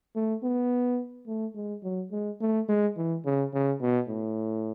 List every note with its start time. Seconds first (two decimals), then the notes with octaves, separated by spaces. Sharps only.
0.15 A3
0.43 B3
1.27 A3
1.55 G#3
1.83 F#3
2.12 G#3
2.41 A3
2.69 G#3
2.97 E3
3.25 C#3
3.54 C#3
3.81 B2
4.09 A2